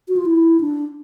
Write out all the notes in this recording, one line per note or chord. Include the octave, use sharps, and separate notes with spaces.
F#4
F4
E4
D4